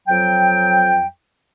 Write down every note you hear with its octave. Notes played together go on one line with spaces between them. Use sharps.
F2 F#3 G5